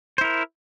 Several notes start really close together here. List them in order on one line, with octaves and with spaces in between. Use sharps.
C5 E4 A#4